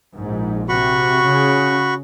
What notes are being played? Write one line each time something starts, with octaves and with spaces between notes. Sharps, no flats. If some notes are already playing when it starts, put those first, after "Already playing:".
A#1 G#2
C3 F#4 B5 C#6
C#3